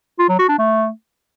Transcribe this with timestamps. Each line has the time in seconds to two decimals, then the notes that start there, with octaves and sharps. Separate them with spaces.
0.19 F4
0.29 F#3
0.39 F#4
0.49 D4
0.59 A3